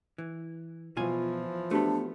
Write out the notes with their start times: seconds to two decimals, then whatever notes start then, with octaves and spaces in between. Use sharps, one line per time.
0.18 E3
0.97 B2 E3 F3 F4 G#5
1.71 A3 B3 D4 F#4 G4